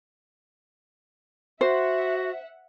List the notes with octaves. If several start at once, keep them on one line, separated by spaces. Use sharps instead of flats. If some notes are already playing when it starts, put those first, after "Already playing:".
F#4 C5 E5 F#5